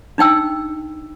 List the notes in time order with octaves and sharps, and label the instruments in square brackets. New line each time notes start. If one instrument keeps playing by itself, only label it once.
[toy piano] D4 D#4 G5 E6